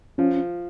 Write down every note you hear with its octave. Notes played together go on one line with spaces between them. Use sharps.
F3 C#4